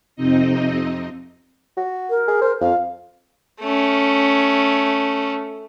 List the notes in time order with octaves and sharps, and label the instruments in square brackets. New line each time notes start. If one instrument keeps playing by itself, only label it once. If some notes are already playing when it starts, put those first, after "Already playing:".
[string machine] F2 C3 C4 D#4 D#5
[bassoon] F#4
[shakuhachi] A#4
[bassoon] G#4
C5
[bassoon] F2 [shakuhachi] F5
[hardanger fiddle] A3 C#4